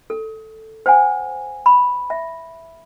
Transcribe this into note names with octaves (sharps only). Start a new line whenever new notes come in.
A4
C5 C#5 F#5 G#5
B5
E5